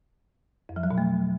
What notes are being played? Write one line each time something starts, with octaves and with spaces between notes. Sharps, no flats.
F2
F3
F#3
B2
A3